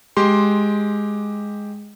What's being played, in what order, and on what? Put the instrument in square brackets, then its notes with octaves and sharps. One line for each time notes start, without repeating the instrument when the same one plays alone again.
[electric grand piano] G#3 G4 C6